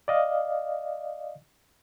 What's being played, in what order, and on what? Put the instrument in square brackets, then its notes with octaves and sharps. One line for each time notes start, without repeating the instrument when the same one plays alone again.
[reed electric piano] D5 D#5 F5